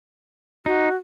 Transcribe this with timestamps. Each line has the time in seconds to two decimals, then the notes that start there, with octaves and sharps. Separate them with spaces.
0.66 D#4 F#4